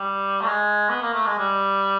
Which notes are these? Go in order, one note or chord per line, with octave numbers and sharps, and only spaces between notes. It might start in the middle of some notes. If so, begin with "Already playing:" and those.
Already playing: G3
A3
G#3
B3
A#3
A3
G#3
G3